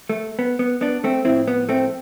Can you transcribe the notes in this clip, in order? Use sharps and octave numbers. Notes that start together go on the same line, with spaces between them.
A3
B3
B3
B3 D4
A3 C4
A2 F3 C4 E4
B3
A3 C4